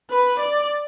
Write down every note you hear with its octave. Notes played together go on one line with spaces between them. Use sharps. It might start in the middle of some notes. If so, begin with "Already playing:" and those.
B4
D5